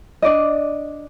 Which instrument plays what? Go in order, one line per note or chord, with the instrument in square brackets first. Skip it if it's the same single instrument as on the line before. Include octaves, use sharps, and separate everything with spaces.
[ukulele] D4 D5 D#5